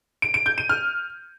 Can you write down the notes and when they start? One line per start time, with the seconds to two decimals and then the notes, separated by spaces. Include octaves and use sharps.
0.22 D7
0.34 D7
0.46 G6
0.58 D#7
0.69 F6